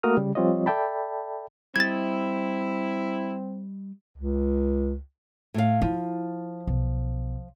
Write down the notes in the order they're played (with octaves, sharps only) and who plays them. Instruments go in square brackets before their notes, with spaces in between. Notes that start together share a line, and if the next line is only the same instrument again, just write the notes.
[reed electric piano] A3 A#3 F#4 A#4 D#6 F6
C#3 G3
F3 G3 C4 F4 C#5 D#5
A4 D5 E5 G5 A5 B5
[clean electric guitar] G3 D#5 [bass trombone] C4 [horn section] E4 [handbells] G#6 A6
[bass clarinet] C#2
[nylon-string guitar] A2 F5
[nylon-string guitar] F3 [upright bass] E4
[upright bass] B1